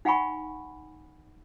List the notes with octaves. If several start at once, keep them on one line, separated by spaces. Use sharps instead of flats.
D#4 F5 F#5 G#5 B5 C#6